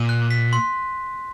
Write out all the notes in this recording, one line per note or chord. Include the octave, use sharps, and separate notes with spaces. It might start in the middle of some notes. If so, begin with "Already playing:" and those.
Already playing: A#2 D#7
F#6
B6
C6